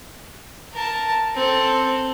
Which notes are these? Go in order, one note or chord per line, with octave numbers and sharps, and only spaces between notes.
A#4 A5
C4 A4